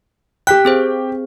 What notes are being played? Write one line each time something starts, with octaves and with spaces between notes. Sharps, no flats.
G4 G5 F#6 B6
C4 G#4 C5